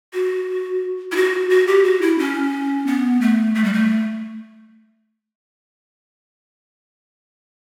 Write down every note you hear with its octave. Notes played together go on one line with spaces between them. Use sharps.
F#4
E4
F#4
F#4
G4
F#4
E4
C#4
B3
A3
A3
G3
A3